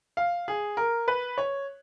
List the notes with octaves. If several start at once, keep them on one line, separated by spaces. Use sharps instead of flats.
F5
G#4
A#4
B4
C#5